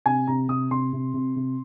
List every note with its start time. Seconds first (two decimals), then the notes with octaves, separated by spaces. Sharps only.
0.06 C3 G#5
0.27 C3 A#5
0.49 C3 D#6
0.71 C3 C6
0.93 C3
1.14 C3
1.36 C3